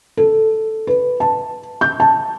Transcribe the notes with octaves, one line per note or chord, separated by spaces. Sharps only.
A4
B4
A5
G6
A5